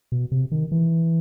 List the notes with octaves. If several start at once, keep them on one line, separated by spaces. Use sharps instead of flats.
B2
C3
D#3
E3